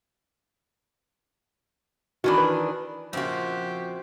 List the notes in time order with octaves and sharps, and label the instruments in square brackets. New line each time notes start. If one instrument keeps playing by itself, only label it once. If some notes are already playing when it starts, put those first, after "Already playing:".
[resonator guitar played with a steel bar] D#3 E3 D4 [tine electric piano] F#4
[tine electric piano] B4
[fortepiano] A#1 C#3 [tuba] F3 [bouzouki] C4 F#4 [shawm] G4